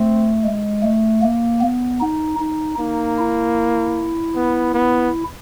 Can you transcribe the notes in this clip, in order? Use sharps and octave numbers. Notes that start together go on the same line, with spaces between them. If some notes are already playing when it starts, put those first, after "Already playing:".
Already playing: A3 C4
G#3
A3
A#3
B3
D#4
D#4
A#3 D#4
E4
B3
B3